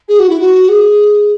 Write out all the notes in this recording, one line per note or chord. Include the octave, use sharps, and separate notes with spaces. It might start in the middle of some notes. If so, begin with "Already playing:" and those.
G#4
F#4
E4
F#4
G#4